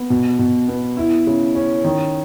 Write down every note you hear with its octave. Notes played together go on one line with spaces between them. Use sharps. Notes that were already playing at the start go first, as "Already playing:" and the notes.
Already playing: B3
B2
B2
B3
E4
C#3
C#4
D#3